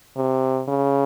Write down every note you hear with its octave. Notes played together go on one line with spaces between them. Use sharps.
C3
C#3